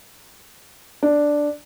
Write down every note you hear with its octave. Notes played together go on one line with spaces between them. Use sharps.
D4